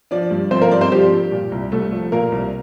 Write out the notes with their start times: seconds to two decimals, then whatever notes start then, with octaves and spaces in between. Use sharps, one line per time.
0.11 F3 D4 D5
0.31 G2
0.51 F3 C4 C5
0.62 A#3 A#4
0.71 G2 D4 D5
0.81 C4 C5
0.92 F3 G3 G4
1.12 G2
1.32 A#2
1.52 C2
1.72 C2 A3 A4
1.93 F3
2.12 A#2 A#3 A#4
2.32 C2